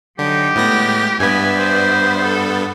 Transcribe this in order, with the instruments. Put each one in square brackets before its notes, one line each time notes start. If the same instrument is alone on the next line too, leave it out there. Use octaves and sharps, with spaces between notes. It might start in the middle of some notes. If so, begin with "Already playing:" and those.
[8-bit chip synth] D3 [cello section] F#3 D#4 [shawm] G4
[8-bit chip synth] A2 B3 A#6 [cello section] G#3
[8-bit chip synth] G2 B3 [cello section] B4 D5 E5 [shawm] G#5
[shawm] C5
[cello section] A4